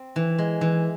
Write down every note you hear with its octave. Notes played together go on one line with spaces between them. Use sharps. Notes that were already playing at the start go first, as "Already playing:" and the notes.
Already playing: C4
E3
G#3
E3